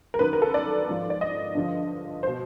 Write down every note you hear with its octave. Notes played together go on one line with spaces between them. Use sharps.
A#4
F#2 D#3 B4
A#4
A4
D5
G#2 F3
D5
D#5
G2 D3 F3
C5
B2